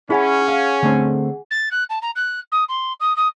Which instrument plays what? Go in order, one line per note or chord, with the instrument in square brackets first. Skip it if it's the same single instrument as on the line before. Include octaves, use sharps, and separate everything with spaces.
[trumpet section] C#4 [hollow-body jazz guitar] E4 [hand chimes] G#4 F#5 G#5
[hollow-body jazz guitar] F5
D3 A3 C4
[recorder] A6
F#6
A5
A#5
F#6
D#6
C6
D#6
D#6